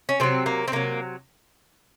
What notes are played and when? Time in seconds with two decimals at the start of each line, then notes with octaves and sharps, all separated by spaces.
0.09 C#4
0.20 C3 D#3 F#3 C4
0.46 A#3
0.68 C4
0.72 C3 D#3 F#3 A#3